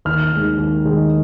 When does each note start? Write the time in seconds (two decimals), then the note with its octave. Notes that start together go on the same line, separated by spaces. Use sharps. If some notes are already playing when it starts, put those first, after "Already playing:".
0.05 D#2 F6
0.32 D#3 G#3
0.58 D#2
0.86 D#3 G#3